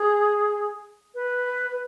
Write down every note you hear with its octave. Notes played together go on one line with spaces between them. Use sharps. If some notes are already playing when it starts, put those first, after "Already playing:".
Already playing: G#4
B4